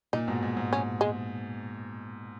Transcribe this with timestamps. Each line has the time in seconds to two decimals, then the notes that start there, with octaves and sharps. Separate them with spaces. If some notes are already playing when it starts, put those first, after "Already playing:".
0.13 A#2 D#4
0.28 G#2 B2
0.43 G#2
0.57 G#2
0.73 C#4
1.01 G#3